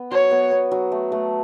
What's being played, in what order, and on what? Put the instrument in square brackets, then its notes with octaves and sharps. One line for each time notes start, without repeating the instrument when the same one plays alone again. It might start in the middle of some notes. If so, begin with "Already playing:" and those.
Already playing: [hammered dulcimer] B3
[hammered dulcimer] F#3 [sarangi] C#5
[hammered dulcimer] B3
B3
F#3
A3
A3